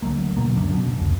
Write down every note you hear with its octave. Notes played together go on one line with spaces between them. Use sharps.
D2 F#3 A3 A#3
B2 F#3 A#3
C#2 F#2 D3
B2
F1 C#2